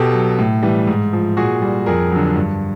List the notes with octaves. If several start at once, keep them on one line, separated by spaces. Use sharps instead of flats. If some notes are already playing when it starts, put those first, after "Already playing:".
Already playing: B2 G4 A4
F#3
A2
E3 G3
G#2
F3
A#2 F#4 G#4
G3
F2 G#4 A#4
D3 F#3
G2